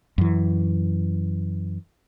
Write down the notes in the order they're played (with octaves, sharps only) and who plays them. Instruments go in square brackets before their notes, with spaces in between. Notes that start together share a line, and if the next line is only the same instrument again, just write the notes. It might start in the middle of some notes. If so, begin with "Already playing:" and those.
[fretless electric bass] F#2 E3